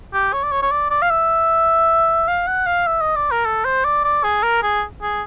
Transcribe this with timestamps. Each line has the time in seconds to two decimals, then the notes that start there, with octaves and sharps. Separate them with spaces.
0.13 G4
0.33 C#5
0.43 D5
0.52 C#5
0.62 C#5
0.71 D5
0.90 D5
1.02 F5
1.10 E5
2.28 F5
2.47 F#5
2.66 F5
2.87 E5
3.01 D#5
3.16 D5
3.31 A#4
3.46 A4
3.65 C5
3.85 D5
4.04 D5
4.24 G#4
4.43 A#4
4.62 G#4
5.02 G#4